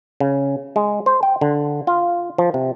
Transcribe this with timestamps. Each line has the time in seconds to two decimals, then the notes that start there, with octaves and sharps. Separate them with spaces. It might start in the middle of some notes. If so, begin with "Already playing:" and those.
0.20 C#3
0.76 G#3
1.06 C5
1.23 G5
1.41 D3
1.87 F4
2.38 F3
2.54 C3